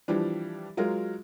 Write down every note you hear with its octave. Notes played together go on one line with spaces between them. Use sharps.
E3 F3 G3 D4
F#3 G#3 F4 A#4